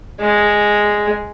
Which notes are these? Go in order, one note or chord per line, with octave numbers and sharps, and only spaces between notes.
G#3